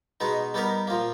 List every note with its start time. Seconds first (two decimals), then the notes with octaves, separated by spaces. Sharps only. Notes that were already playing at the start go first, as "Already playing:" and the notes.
0.20 B2 G#3 B3 D#4
0.54 G3 B3 D#4 G4 A#4
0.87 A#2 F3 A#3